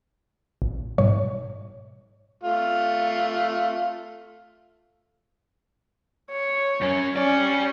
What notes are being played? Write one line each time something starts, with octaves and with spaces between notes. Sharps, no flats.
A1
G#2 B2 G3 C#5
A3 F4
C#5
F#2 C#4
C#4 G4 D5